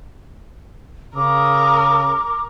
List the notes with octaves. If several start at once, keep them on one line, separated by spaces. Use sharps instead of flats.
C#3 A#4 D6 D#6